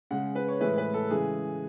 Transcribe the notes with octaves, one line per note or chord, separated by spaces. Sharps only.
C#3 G#3 F#5
B4
C#5
A2 E3 G#3 B4
B4
A4
C#3 E3 G#3 G#4